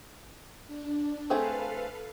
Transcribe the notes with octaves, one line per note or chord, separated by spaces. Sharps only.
D4
A3 C4 G#4 A4 B4 F5